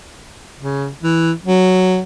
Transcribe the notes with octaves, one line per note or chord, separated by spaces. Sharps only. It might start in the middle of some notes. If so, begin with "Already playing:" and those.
C#3
E3
F#3